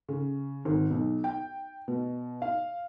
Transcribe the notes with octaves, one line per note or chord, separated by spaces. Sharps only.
C#3
G#1
B1
G5
B2
F5